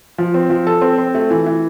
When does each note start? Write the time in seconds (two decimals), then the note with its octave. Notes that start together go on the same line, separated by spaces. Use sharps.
0.18 F3
0.34 C4
0.50 F3
0.67 A4
0.81 C4
0.98 C4
1.15 A3
1.30 E3
1.46 E3